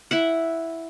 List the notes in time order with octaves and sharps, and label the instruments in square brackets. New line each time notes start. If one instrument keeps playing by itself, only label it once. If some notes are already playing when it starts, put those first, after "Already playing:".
[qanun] E4 E5 F#5